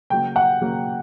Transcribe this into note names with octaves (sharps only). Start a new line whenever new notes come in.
C#3 F#3 A#3 G5
F#5
C#3 F#3 A#3